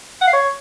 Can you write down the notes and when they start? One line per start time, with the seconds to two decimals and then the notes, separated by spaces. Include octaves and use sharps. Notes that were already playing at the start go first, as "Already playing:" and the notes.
0.21 F#5
0.27 F5
0.33 C#5